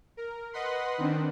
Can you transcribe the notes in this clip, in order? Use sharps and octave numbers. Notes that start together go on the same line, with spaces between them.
A#4
B4 D#5 F#5 B5 C6
D#3 C4 D4